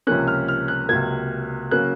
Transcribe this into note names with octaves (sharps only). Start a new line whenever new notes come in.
C#2 C3 F3 A#3 C#4 F#6
F6
F6
F#6
C#2 C3 F#3 A#3 G#6
C#3 F#3 A#3 C#4 F#6